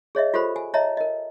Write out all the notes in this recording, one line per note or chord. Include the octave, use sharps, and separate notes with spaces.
G#4 C#5 D#5 E5
F4 G4 A4 C5 B5
G#5
C#5 D#5 E5 A5 A#5
A#4 D#5